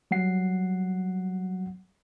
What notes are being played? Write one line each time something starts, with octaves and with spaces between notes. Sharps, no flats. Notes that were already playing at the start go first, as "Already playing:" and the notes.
F#3 G3 F#5 C7